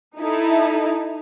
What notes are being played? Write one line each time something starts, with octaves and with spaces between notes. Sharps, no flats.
D#4 E4 A4